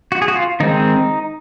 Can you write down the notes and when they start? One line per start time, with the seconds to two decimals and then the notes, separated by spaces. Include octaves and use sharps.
0.12 F#4
0.22 G#4
0.28 F#4
0.35 F4
0.60 D#3 G#3 C4 D#4